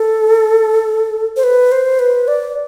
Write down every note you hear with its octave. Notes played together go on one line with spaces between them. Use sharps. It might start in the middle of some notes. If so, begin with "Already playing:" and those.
Already playing: A4
C5
B4
C5
B4
D5